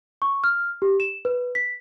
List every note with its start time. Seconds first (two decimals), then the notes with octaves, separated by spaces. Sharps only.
0.22 C#6
0.44 F6
0.82 G4
1.00 E7
1.25 B4
1.55 B6